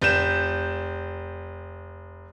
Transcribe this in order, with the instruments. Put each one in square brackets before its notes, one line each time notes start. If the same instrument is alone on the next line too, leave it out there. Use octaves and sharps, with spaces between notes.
[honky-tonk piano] F1 G6 E7